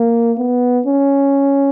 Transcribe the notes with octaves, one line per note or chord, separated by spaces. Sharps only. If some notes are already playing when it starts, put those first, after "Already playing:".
Already playing: A#3
B3
C#4